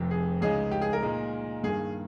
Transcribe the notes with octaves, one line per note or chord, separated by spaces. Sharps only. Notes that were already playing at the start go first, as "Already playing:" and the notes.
Already playing: F1 F2 C3
G#4
C#2 C#3 G#3 D#4 G#4
G4
G#4
A#4
A#2 G#3 D#4 G#4
G2 D#3 A#3 G#4